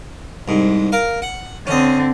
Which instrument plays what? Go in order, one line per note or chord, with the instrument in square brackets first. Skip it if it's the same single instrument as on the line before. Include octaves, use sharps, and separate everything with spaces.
[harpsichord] C2 G#2
A#4 F5
F#5
[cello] D3 C4 [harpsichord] C#4 D#5